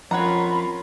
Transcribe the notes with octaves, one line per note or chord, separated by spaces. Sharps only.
F2 C#4 F4 A#4 C#5 F#5 A#5 B5